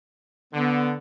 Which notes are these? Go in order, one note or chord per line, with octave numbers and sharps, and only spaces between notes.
D3 B3